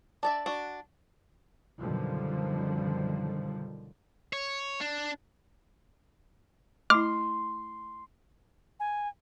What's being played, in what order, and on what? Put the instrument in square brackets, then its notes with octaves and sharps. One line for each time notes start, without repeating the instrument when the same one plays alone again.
[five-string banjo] D4 D5 E5
D4 F#4
[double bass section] F#2 B2 D3 D#3 F3 G3
[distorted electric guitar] C#5
D4
[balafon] A3 E4 [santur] C6 [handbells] D6 [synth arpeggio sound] F6
[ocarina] G#5